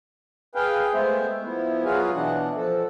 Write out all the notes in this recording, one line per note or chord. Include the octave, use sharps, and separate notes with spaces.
G#4 B4 F5 G5
G#3 A3 B3 C5 E5
F3 B3 E4
F#3 F4 F#4 G#4 B4 F5
B2 E3 D4 F#5
F3 A4